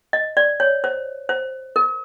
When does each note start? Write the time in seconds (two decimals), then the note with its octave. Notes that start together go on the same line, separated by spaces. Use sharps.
0.13 D#5
0.37 D5
0.60 C#5
0.84 C5
1.29 C5
1.76 A#4